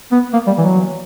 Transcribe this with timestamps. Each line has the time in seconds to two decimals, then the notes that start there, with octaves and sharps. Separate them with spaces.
0.12 B3
0.33 A#3
0.47 G3
0.58 E3
0.61 F#3